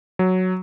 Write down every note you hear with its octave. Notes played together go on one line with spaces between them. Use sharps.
F#3